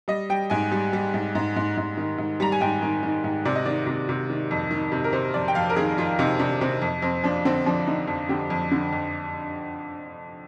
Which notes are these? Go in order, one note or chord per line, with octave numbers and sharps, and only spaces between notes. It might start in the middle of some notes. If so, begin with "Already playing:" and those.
G3 D#5
G3 G5
G#2 G#5
G3
G3
G#2
G#2
G#2
G#2
D#3
G#2
G3 A#5
G#5
G#2 G5
D#3
D#3
G#2
C3 D5
D#5
D#3 D5
C3
C3
D#3
F2
D#3
C3
A#4
C3 C5
F2 D5
G5
F2 F5
A#4
D#3 G#4
F2 F4
C3 D#4
C3 D4
C3 C4
F2
F2 C4
F3 D4
D3 C4
F3 D4
D3 D#4
F2
D3 G4
F2
D3
F2